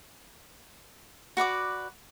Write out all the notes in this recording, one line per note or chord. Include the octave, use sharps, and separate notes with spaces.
F#4 B4 D5 D6